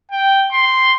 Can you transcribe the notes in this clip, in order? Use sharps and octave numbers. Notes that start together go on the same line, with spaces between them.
G5
C6